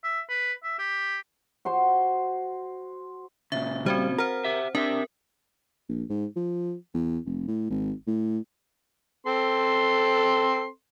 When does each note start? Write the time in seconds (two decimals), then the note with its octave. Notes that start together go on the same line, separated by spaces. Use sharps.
0.04 E5
0.29 B4
0.64 E5
0.79 G4
1.65 F#4 C5 C6
3.52 A#2 C#3 E5
3.86 G3 C4 F#4 C5
4.18 A#4 C5 F#5
4.45 G4 E5
4.75 C4 D4 G4 A#4 E5
5.89 A#1
6.10 G#2
6.36 F3
6.94 E2
7.26 F1
7.47 A2
7.70 G#1
8.07 A2
9.27 C4 A4 C6